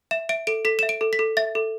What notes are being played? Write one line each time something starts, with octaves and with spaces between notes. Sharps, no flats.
E5 E7
E5 D7
A4 D7
A4 B6
E5 E7
D7
A4
B6
A4
E5 A6
A4